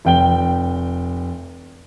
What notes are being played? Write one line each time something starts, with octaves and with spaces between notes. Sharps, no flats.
F1 G5 G7